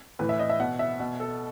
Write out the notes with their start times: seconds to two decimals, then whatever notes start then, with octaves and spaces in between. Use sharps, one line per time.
0.19 A2 E3 B4
0.29 E5
0.39 D#5
0.50 E5
0.60 B2 F#5
0.79 E5
1.00 B2
1.20 A4